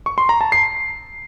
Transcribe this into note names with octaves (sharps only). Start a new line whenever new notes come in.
C#6
C6
A#5
A5
C7